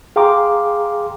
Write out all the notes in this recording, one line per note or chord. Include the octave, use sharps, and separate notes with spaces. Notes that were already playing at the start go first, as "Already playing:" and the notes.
G#4 F5 G5 A#5 C6 D6